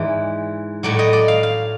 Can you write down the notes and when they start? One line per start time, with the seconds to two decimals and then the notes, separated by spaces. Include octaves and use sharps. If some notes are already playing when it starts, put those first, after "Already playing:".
Already playing: G#2 E3 D5
0.83 A2 F#3 D5
0.99 D#5
1.13 D5
1.28 F5
1.43 F5